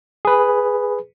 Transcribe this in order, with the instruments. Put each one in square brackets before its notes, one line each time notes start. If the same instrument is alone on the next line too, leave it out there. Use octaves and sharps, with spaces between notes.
[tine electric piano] G#4 B4